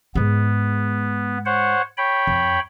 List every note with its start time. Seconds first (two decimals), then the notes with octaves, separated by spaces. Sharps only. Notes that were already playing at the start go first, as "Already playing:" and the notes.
0.15 G#2 G#3 B3
1.45 C5 C#5 F#5
1.97 C#5 G5 B5
2.27 F2